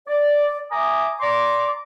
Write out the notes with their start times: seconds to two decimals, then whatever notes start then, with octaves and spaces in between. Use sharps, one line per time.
0.07 D5
0.71 E5 G#5 A#5 D6 D#6
1.20 D5 A#5 C6 D6